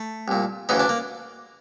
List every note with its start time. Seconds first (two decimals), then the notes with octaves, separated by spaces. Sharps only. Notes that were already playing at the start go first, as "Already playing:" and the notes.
Already playing: A3
0.28 C2 A#2
0.69 D2 C#3 E3 D#4
0.79 D4
0.89 A#3